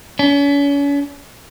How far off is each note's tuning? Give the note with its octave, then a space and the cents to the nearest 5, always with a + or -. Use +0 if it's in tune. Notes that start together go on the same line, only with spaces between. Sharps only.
C#4 +40